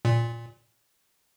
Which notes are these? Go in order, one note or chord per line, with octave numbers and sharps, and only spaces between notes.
A#2